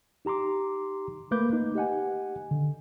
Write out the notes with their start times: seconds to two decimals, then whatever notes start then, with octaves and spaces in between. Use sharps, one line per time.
0.25 D#4 G4 A#5 C6 D6
1.31 A3 A#3 B4 D6 G6
1.53 D#4
1.75 G4 D#5 F#5 G#5
2.51 D3